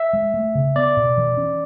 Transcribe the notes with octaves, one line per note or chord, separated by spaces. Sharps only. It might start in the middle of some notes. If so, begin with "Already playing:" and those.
Already playing: E5
G#3
A3
C#3
B3 D5
B2
E3
C#4